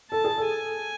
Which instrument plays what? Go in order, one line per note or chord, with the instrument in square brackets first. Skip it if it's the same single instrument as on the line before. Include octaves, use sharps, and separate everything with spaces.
[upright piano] A4 [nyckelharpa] A5
[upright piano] G#4
A4
[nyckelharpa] G#5